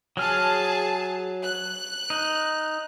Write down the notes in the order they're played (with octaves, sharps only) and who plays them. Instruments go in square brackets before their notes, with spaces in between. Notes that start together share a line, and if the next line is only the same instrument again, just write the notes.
[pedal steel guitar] F#3 F6 [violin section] G#4 A5
[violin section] F#6
[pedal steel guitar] D#4